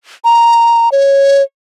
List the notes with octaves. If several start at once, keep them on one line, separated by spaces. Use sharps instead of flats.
A#5
C#5